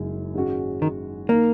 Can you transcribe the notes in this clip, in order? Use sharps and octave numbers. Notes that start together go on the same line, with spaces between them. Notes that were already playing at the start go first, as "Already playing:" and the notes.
Already playing: F#1 F#2 G#3 D#4
G#2 D#3 G#3 C#4 F#4
D#3
D#3 A#3